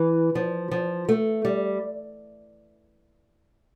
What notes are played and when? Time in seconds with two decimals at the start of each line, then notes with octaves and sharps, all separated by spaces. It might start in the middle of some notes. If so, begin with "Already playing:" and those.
Already playing: E3
0.35 F3
0.71 F3
1.09 A3
1.45 G3